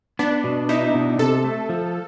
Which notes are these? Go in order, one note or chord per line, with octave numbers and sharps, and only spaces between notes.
B3 D4
B2
D#4 E4
B2
C3 A4
A3
F3